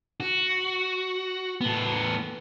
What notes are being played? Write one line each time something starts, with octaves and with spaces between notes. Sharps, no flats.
F#4
A2 B3